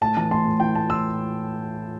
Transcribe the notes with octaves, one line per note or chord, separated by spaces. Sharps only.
A2 A5
E3 A5
A2 A5 C6
A2
E3 G5
A2 A5
A2 C6 E6